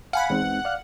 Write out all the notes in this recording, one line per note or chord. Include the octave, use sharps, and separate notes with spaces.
F5 F#5 G#5 B5
E2 G#3 C4 D#4
D5 F5 F6